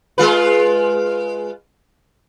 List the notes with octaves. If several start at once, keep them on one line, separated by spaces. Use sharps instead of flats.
G#3 F4 B4